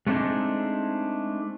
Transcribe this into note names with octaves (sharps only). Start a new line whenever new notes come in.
G#3 A3 C4 D4 D#4 G#4